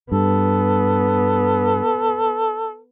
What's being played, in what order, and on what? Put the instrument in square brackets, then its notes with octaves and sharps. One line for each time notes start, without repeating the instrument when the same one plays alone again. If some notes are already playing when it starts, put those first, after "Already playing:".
[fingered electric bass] G2 [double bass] B3 [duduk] A4